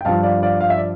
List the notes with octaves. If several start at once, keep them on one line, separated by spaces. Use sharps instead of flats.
G5
G2 F3 F5 A5
D5 F5
D5 F5
F5
E5
D5